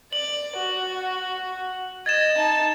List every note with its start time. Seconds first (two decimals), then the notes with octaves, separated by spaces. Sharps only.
0.13 D5 F#7
0.57 F#4
2.06 D#5 G#6 A6 E7
2.37 D#4 A5